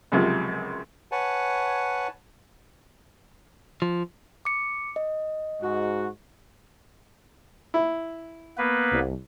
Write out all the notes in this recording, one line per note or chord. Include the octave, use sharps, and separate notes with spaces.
C#2 F#2 C3 F3
B4 C#5 F#5 G#5 A5
F3
D6 C#7
D#5
G#2 F#4
E4
A#3 B3 B4
C2